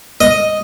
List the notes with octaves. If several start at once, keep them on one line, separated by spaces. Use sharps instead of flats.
D#5